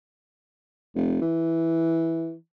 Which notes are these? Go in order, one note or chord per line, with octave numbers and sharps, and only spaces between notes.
F1
E3